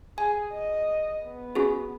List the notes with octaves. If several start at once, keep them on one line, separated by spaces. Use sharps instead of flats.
G#4 G#5
D#5
B3
C#4 F#4 G#4